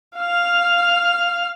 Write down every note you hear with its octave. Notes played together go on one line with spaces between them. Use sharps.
F5 F6